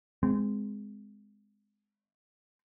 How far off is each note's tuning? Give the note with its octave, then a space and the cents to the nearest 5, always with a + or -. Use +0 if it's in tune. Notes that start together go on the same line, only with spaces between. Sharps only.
G#3 +0 C4 -25